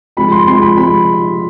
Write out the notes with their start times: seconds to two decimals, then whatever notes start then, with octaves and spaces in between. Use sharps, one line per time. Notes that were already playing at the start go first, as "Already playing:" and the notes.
0.17 C3 F3 G#3 B5
0.32 C6
0.47 C3 F3 G#3 C6
0.62 B5
0.78 C3 F3 G#3 B5